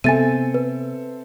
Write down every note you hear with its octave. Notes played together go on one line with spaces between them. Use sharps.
C3 B3 C4 A4 E5 G#5 A6 D#7
B4